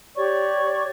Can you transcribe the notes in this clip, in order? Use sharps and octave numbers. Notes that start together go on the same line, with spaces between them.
G4 C#5 D5 C#6